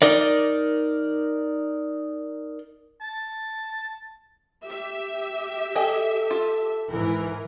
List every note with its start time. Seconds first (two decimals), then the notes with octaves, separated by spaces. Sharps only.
0.02 D#4 A#4 D5
3.01 A5
4.65 G4 E5
5.75 G#4 A4 D#5 G5
6.31 F4
6.92 G#2 E3 A#4